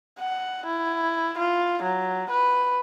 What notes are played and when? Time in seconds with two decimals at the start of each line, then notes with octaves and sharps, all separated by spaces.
0.19 F#5
0.66 E4
1.38 F4
1.82 F#3
2.30 B4